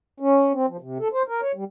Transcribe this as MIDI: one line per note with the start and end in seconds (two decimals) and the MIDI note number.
0.20 0.52 61
0.53 0.66 60
0.67 0.77 53
0.81 0.98 48
1.00 1.08 69
1.13 1.23 72
1.28 1.41 70
1.42 1.52 73
1.55 1.64 55